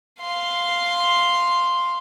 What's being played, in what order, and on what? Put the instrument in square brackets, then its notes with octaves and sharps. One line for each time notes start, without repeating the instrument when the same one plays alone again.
[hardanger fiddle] F5 C6